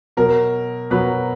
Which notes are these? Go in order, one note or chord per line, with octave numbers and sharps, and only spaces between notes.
B2 F#3 A#4
B2 F#3 B4